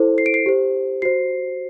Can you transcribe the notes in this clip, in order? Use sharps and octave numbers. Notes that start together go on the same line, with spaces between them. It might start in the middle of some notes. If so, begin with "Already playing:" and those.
Already playing: E4 A4 C5
C7
D7
C7
G4 C5
F#4 C5 C7